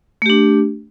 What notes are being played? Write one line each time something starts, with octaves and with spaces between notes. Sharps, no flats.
A3 D4 G4